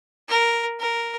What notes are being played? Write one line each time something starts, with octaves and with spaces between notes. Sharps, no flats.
A#4
A#4